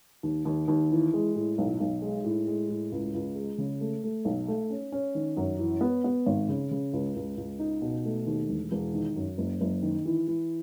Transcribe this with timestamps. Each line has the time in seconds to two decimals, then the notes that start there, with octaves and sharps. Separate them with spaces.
0.23 D#2
0.45 D#2
0.68 D#2
0.91 E3
1.13 G#3
1.36 A2
1.58 B1
1.80 B1
2.02 G#3
2.24 A2
2.47 G#3
2.69 A2
2.92 C#2
3.14 C#2
3.35 G#3
3.58 C#3
3.81 A3
4.04 A3
4.25 B1
4.48 A3
4.70 C#4
4.92 C#4
5.15 D#3
5.37 F#2
5.59 E3
5.81 B3
6.04 B3
6.26 G#1
6.49 C#3
6.71 C#3
6.93 C#2
7.16 C#2
7.37 C#2
7.59 D#4
7.82 B2
8.05 A3
8.27 D#2
8.49 E1
8.72 E1
8.94 D#3
9.16 F#2
9.38 F#1
9.61 F#1
9.82 D#3
10.06 E3
10.28 E3